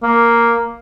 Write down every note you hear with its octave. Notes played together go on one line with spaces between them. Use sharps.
A#3